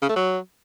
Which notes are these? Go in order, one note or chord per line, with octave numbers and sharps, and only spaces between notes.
C#3
A3
F#3